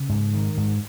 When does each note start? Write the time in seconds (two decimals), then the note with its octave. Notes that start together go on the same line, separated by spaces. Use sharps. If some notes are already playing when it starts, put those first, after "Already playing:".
Already playing: C#3
0.09 G#2
0.33 D#3
0.57 G#2